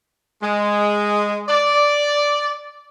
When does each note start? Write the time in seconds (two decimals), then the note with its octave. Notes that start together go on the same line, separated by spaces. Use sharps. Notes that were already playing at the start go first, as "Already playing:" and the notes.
0.43 G#3
1.49 D5